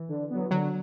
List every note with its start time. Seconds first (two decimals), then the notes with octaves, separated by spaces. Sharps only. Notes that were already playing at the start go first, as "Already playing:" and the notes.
Already playing: E3
0.09 D3
0.30 F#3 B3
0.51 D3 F#3